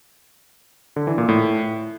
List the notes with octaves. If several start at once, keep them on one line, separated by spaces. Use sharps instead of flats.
D3
E3
A#2
A2